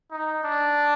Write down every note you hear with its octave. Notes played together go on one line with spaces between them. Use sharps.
D#4
D4